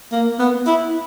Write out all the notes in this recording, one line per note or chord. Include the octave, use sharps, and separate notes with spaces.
A#3
B3
E4